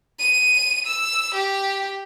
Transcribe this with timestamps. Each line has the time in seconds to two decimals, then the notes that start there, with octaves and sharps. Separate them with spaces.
0.19 D#7
0.86 E6
1.35 G4